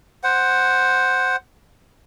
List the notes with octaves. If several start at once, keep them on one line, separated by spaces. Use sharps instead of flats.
C5 F#5